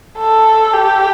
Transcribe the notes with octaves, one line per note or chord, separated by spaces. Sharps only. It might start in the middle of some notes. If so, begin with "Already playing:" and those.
A4
G4